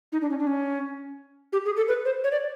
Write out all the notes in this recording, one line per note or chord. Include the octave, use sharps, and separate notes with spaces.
D#4
D4
C#4
D4
C#4
G4
G#4
A4
B4
C5
C#5
D5